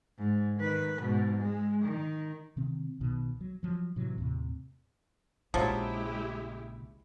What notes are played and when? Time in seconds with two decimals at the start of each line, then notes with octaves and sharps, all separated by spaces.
0.19 G#2
0.58 D#3 B4
1.01 G#2 B2
1.36 G#3
1.85 D#3
2.57 C3 D#3 C4
3.00 B1 B2 D#3
3.41 F#3
3.63 F3 F#3
3.96 A2 C3 E3 F#3
4.18 D#2 A2 C3
5.54 A#1 C#3 F3 F#3 G#3 E4 G4